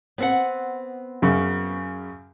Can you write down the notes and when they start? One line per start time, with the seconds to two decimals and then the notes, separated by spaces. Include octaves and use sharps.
0.18 B3 C4 F#5
1.22 F#2 C#3